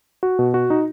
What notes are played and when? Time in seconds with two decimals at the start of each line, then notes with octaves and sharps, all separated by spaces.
0.23 F#4
0.39 B2
0.54 F#4
0.70 D#4